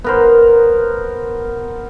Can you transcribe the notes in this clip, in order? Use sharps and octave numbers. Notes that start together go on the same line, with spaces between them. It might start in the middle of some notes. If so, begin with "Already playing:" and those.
B3 A#4 C5